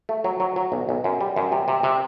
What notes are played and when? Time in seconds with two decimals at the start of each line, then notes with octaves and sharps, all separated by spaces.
0.09 A3
0.24 F#3
0.40 F#3
0.56 F#3
0.72 B1
0.89 B1
1.04 F#2
1.21 G3
1.36 F#2
1.52 C3
1.68 C3
1.83 C3